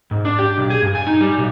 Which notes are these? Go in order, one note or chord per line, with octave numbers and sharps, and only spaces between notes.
G#2
D4
G4
B1
G#4
G2
G#5
D#4
G3
B1